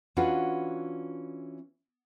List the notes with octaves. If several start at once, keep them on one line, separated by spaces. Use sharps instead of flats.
E3 C#4 D4 F4 F#4 B4